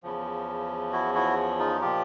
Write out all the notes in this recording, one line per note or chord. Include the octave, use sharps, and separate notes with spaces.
E2 C#3 F3
E4 F#4
E4 F#4
D#4 F4
A#2 F3 F4 G4